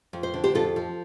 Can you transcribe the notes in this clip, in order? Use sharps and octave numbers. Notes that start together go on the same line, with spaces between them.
F2
C5
D3
G4 C5
F2 F4 A4
F3